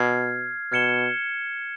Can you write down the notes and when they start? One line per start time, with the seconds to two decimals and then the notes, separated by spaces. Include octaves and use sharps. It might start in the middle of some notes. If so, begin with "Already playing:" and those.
Already playing: B2 F6 G#6 C7
0.72 B2 F6 G#6 C#7 E7 G7